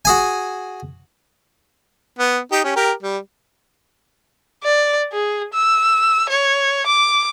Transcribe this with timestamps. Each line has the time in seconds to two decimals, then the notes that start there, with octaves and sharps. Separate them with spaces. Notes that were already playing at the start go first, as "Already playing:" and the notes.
0.05 F#4 G#4 G#5
2.19 B3
2.52 D#4 G4
2.64 C#4 G4
2.76 G4 A#4
3.03 G3
4.64 D5
5.12 G#4
5.54 E6
6.29 C#5
6.86 D6